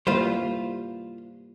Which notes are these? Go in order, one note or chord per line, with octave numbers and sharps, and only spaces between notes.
G3 A#3 E4 F4 B4 C5